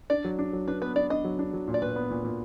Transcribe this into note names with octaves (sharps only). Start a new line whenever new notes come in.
D4 D5
F#3
D4
F#3
D4 B4
B3 B4
D4 D5
D4 D#5
F#3
D4
F#3
A#2
D5
A#2 B4
B3
A#2
A#2